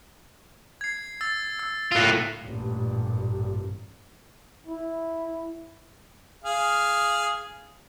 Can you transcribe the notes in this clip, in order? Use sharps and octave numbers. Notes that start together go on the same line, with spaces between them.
G#6 C7
E6 A6
E6
A2 F4 E6 F#6
A1 G2 A#2
E4
G#4 F5